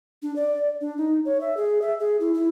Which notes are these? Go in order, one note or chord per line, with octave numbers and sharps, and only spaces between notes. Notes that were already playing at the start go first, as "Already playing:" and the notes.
D4
D5
D4
D#4
C#5
E5
G#4
E5
G#4
E4
E4